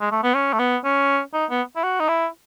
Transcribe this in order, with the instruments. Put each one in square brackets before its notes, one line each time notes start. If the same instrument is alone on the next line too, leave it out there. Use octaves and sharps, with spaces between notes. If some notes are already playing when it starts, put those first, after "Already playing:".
[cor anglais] G#3
A3
B3
C#4
A3
B3
C#4
D#4
B3
E4
F#4
D#4
E4